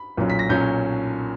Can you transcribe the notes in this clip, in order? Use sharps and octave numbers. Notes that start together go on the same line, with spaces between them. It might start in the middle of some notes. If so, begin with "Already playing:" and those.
Already playing: B5
B1 A#2 F#3 C#4
B6
A#6
B1 A#2 F#3 C#4 G6